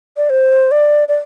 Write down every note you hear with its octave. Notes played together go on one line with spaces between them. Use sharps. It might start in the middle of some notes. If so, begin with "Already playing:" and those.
D5
C5
D5
D5